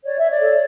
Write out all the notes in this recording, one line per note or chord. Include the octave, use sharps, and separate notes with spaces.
C#5 D5
E5
C#5
D5
A4